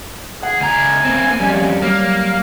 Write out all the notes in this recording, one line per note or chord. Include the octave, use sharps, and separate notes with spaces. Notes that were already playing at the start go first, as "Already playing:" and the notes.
G#4 F#5
C#2 G#5 A#5
A#3 C4
F2 G3 C#4
F#3 G3 A#3 F5